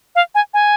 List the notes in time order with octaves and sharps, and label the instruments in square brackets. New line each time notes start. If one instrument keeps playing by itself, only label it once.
[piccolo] F5
G#5
G#5